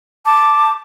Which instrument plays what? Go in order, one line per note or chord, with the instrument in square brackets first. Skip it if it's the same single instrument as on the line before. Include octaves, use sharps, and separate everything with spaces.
[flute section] A5 D6